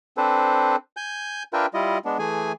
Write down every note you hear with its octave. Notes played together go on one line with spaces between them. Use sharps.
C4 D4 A4 B4 C5
G#5 G6
D4 F4 A#4 B4 E5 G5
G3 E4 F4 D#5
G#3 B3 D4
E3 A3 G#4 G#5